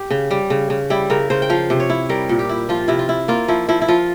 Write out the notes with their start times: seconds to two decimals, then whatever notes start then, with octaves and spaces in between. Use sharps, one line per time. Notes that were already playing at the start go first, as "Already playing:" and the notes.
Already playing: G4
0.11 C#3
0.31 G3
0.50 C#3
0.70 C#3
0.90 G3 E4
1.10 C#3 A#4
1.30 C#3 C5
1.42 G5
1.50 F3 F5
1.70 C3
1.80 C#5
1.90 E4
2.09 G3 A#4
2.29 A#2
2.39 G4
2.49 E4
2.69 F3 F4
2.88 C3 E4
2.99 F4
3.09 E4
3.28 A#3 F4
3.48 F3 E4
3.69 F3 E4
3.82 E4
3.88 F3 F4